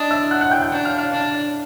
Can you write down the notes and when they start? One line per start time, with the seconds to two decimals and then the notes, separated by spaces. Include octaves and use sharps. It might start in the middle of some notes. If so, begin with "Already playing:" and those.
Already playing: D4 D#5 D#6
0.11 E5 E6
0.31 F#5 F#6
0.41 F#5 F#6
0.51 G5 G6
0.62 G5 G6
0.71 D4
0.85 F5 F6
0.99 F5 F6
1.12 D4